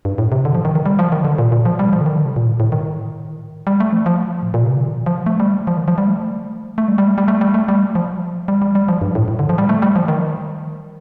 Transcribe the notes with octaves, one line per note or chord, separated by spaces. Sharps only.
G2
A2
C3
D3
F3
D#3
D#3
G3
F3
D#3
D3
A#2
A#2
F3
G3
F3
D3
D#3
D3
C3
A#2
A2
A#2
A2
D#3
G3
A3
F3
F3
A2
A#2
C3
D3
D#3
F3
A3
G3
F3
D#3
F3
G3
A3
A3
G3
G3
A3
G3
A3
G3
A3
G3
F3
G3
G3
G3
F3
G2
A2
A2
D3
F3
G3
A3
G3
F3
D#3